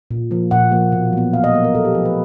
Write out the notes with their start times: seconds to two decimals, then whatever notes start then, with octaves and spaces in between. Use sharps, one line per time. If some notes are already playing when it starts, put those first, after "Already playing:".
0.11 A#2
0.31 F3 A#3
0.51 A#2 F#5
0.72 F3 A#3
0.92 B2
1.13 F#3 B3
1.33 B2 F5
1.44 D#5
1.54 F#3 B3 A#4
1.64 A#4
1.75 A#2 A4
1.85 G4
1.95 F3 B4
1.98 A3
2.05 B4